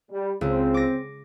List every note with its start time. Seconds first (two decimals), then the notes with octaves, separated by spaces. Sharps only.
0.10 G3
0.41 C#2 C4
0.74 D6 A#6